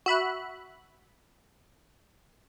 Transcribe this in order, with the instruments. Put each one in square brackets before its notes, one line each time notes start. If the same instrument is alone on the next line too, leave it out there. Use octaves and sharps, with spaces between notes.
[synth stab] F#4 E5 B5 F#6